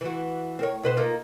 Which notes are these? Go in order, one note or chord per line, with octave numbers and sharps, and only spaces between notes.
E3 F#4
C4 A#4 C#5
B2 B4 C5
A#3 D#4 F4